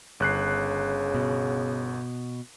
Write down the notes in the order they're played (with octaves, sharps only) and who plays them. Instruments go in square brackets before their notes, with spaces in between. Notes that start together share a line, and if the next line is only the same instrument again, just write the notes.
[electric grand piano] G1 F#6 C7 [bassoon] C#3
[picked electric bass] B2